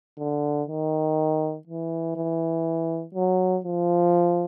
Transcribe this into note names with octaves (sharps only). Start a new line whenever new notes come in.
D3
D#3
E3
E3
F#3
F3